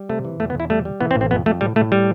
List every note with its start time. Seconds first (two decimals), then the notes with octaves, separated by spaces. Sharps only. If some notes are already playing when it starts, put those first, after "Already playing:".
Already playing: G3
0.09 C3 A3
0.25 E3
0.40 E2 A3
0.50 B3
0.55 E2 E4
0.70 G3 A3
0.85 G3
1.00 E3 B3
1.11 C4
1.16 A1
1.21 C4
1.31 F2 B3
1.46 F2 A3
1.61 A2 G3
1.76 A2 A3
1.92 G3